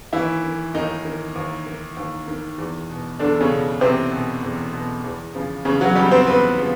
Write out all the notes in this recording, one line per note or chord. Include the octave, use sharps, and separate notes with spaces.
D#2 E3 E4
D#3
D#2 D#3 D#4
D#3
D#2
D#3
D#2
D#3
E2
B2
E2 D3 D4
C#3 C#4
B2
E2 C3 C4
B2
E2
B2
E2
C#3 F3
E2 C#3 C#4
F#3 F#4
C#3 F3 G3 G4
C4 C5
E2 B3 B4
C#3 F3